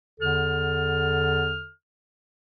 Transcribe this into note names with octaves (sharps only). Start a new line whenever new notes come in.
E2 D3 A4 F6